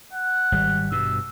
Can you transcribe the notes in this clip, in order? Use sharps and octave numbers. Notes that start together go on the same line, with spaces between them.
F#5
G#1 G3
G2 B2 E6